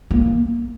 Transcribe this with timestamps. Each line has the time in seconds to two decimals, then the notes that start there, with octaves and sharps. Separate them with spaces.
0.11 A#3